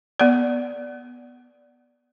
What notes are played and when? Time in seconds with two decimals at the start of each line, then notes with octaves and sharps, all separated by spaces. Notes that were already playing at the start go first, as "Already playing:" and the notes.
0.20 B3 D5